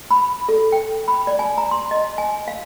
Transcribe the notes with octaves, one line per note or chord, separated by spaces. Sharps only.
B5
A4
G5
B5
D5
G#5
A#5
C6
D#5
G#5
F5